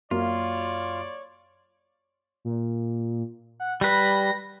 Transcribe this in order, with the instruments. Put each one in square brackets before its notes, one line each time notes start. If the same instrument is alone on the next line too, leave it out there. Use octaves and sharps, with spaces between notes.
[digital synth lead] F#2 [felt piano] A#3 [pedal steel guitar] F4 [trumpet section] C#5 D5
[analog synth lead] A#2
F#5
[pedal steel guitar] G3 B4 [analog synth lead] A#6